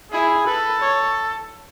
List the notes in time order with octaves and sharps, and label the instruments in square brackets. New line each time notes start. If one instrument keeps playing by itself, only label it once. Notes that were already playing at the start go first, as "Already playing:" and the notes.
[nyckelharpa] E4 [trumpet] G#4
[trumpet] A4 [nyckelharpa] B4
[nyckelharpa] C#5